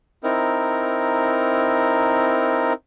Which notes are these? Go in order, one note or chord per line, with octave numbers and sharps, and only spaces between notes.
C4 D#4 E4 A#4